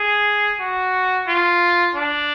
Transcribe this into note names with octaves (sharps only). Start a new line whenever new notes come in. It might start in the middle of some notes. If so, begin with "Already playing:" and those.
Already playing: G#4
F#4
F4
D4